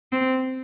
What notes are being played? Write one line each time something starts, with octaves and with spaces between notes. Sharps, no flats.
C4